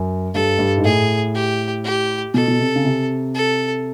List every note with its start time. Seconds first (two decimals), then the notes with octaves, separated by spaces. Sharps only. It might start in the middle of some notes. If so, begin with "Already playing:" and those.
Already playing: F#2
0.34 G2 A4
0.59 G2
0.77 G#2
0.84 A2 G#4
1.34 G4
1.84 G4
2.34 B2 A4
2.48 B2
2.59 C3
2.76 C#3
2.85 C3
3.35 A4